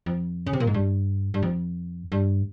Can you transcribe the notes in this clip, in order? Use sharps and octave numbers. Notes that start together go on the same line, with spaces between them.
F2
C#3
C3
A#2
G#2
G2
G2
F2
G2